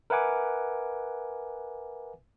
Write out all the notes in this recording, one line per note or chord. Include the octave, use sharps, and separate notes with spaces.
A#4 B4 E5 F#5 G#5 D6